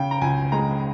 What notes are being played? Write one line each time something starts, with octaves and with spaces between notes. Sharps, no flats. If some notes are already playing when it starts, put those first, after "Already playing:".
Already playing: C#3 G5
A#5
C#2 G#5
G#3 A#5